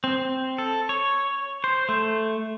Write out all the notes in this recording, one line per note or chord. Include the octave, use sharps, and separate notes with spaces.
C4
A4
C#5
C5
A3